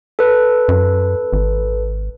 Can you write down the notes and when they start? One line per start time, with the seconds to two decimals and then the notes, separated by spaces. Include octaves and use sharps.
0.19 A4 B4
0.69 F#2
1.33 G#1